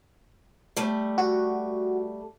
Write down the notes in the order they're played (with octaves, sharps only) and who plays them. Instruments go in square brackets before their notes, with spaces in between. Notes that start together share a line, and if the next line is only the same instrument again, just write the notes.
[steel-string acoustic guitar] G3 A3
[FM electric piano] F#4